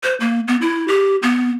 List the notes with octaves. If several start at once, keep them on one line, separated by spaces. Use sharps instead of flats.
C5
A#3
B3
E4
G4
B3